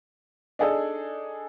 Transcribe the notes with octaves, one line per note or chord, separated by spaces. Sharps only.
D4 D#4 G#4 A4